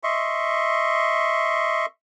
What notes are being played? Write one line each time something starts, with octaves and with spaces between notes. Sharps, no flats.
D#5 E5 C6 C#6